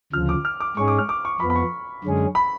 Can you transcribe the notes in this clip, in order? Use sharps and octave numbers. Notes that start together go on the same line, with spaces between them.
D2 C#3 F3 F6
D6
F6
D6
G#2 G#3 C#4 G#4 C#6
D6
F6
D6
C#6
F2 F3 B3 B5
B5
C#6
F#2 D3 G#3 C#4 G#4
B5